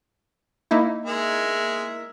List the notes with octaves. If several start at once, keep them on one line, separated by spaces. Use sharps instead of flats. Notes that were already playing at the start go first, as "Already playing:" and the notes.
A#3 D#4 E4
G#3 A#4 E5